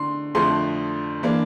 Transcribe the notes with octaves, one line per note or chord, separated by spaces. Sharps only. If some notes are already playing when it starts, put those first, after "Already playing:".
Already playing: D3 C6
F2 D3 F3 A3 C6
E3 A#3 D4